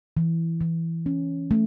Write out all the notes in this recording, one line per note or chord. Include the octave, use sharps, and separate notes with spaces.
E3
E3
C#4
A3